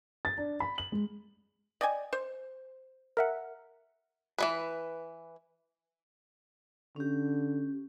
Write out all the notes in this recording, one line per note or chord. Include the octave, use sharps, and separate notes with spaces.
A6
D4
B5
F#7
G#3
D5 D#5 G5 G#5
C5
A#4 E5 F#5
E3 G#3 B4
D3 C#4 G4